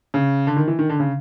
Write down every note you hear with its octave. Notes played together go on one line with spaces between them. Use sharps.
C#3
D3
D#3
E3
D#3
D3
C#3